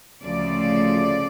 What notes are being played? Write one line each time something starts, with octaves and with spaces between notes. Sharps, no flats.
D2 C#3 F3 A3 D5